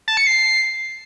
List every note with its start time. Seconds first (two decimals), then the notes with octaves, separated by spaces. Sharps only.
0.08 A5
0.17 C#7
0.27 C7